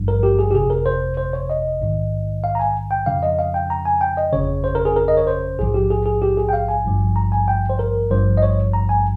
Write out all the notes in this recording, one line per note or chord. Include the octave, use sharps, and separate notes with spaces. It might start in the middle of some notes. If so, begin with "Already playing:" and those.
Already playing: G#1 G2 F3
A#4
G4
G#4
G4
G1 F2 C3 G#4
A#4
C5
C5
C#5
D#5
A#1 G#2 D#3
F5
A#5
G#5
G5
F2 C#3 F3 F5
D#5
F5
G5
A#5
G#5
G5
D#5
G1 F2 C#3 C#5
C5
A#4
G#4
A#4
D#5
C#5
C5
A#1 G#2 F3 G#4
G4
G#4
G#4
G4
G#4
G5
F5
G#5
G#1 G2 F3
A#5
G#5
G5
C5
A#4
G#1 G2 F3 C5
D#5
C#5
A#5
G#5